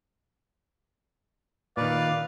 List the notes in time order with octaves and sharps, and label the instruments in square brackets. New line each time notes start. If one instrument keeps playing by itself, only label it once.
[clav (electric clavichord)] A#2 D#3 [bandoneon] B4 [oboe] D5 [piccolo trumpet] F5